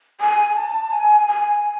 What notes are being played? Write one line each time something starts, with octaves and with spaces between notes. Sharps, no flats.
G#5
A5
G#5
G#5